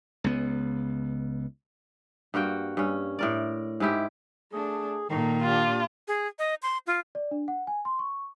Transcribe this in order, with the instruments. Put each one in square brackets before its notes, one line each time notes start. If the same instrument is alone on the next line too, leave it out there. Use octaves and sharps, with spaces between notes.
[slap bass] C#2 B3
[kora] G2 A#3 F#4 G5
G2 C#4
A2 A#4 D5
G#2 G#3 E4 G4
[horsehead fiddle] A3 D4 [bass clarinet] G#4
[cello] A#2 [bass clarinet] D#3 [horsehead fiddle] D#4 A4
[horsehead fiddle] D4 G4 [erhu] F4
[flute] G#4
D#5
C6
F4
[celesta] D5
D4
F#5
G#5
C6
C#6